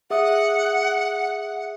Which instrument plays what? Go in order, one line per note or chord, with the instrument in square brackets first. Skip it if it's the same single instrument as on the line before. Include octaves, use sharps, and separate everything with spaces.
[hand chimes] G#4 E5 D#6 [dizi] F#5